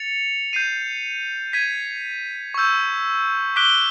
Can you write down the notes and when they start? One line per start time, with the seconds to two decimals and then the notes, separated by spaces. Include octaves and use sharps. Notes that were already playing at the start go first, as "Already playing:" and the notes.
Already playing: A6 C#7 F7
0.53 G6 C7 D#7
1.53 G#6 B6 D#7
2.54 C#6 E6 G6
3.56 D6 F#6 B6 D7 G7